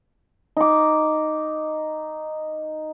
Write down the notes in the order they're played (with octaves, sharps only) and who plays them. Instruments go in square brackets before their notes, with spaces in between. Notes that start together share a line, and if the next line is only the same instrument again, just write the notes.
[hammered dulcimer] D#4 D6